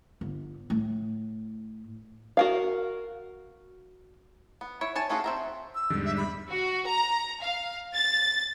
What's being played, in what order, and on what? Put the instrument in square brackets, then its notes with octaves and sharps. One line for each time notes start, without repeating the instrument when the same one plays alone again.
[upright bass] G1
A2
[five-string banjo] F#4 A#4 F5
B3
E4 C#5
C#5 G#5 A5
A3 C#4 F4 F#4 G#4
C4 E5 A#5
[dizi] E6
[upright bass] E2 [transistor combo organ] G#2 D3 G3
[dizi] E5
B5
[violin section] F#4
A#5
F5
A6